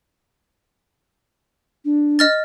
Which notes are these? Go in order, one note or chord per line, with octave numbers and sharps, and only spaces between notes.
D4
D#5 F6 A6